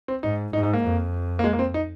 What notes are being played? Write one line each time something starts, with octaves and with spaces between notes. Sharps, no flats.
C4
G#2 D#4
G#2 D#4
D#4
A#3
F2
A#3
G#3
A#3
C4
D#4